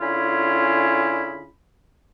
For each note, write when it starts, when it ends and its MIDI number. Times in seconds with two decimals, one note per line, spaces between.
0.01 1.48 50
0.01 1.48 61
0.01 1.48 64
0.01 1.48 65
0.01 1.48 68
0.01 1.48 83